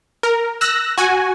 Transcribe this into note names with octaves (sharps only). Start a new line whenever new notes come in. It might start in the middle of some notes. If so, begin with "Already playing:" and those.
A#4
E6 F#6 A#6
F#4 G#5